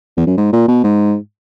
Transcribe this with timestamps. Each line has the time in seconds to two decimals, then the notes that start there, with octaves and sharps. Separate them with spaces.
0.17 E2
0.27 F#2
0.37 G#2
0.53 A#2
0.68 B2
0.84 G#2